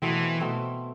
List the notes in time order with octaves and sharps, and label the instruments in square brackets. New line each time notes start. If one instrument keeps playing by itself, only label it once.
[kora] B2 A3 C4 [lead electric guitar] E3
[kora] B2 A3 C4